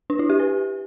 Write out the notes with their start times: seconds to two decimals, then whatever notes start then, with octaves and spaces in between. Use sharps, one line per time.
0.10 D4
0.19 E4
0.30 G4
0.40 B4